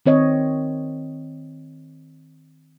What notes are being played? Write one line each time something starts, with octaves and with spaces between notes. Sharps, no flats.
D#3 C4 C#5 D#5